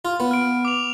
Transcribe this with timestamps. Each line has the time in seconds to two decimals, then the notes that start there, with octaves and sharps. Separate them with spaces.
0.05 F4
0.20 B3
0.31 F6 D7
0.65 D6 F7